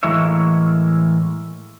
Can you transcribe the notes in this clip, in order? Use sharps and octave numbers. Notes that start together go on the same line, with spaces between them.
A2 E3 G#3 A#3 C#5 E5